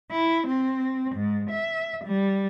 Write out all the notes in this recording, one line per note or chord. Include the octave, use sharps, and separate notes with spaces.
E4
C4
G#2
E5
G3